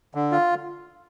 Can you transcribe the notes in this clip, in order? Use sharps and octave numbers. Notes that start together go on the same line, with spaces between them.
D3
F4